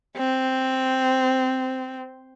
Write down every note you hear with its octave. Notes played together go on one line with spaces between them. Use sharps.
C4